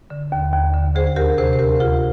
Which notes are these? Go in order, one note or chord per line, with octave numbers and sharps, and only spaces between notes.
D3
D#2
D#2
D3
D2 G#4 C5
G#4
D2 G4 A#4
C3 G#4 C5
C5
D2 G4 A#4
D2 F4 G#4